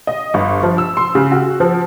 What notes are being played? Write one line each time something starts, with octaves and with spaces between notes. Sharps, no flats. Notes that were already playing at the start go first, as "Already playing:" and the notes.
D#5
G1
F3
E6
C6
C#3
F#4
F3